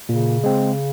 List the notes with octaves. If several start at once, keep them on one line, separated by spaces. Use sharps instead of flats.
A#2 C#3
G#3 C4